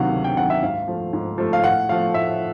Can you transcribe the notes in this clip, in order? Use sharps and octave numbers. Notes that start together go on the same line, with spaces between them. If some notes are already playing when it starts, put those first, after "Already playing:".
Already playing: D2 C3 D#3 F#3 F5 F#5
D2
G5
C3 D#3 F#3 F#5
E5
G#2 F5
F3 A3
G#2
F3 A3
F5
A2 F#5
F3 A3 F5
A2 E5